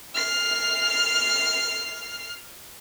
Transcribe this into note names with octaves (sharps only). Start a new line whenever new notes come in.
F6 C7